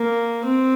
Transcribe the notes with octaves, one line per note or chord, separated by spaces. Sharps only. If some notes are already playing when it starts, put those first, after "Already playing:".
Already playing: A#3
C4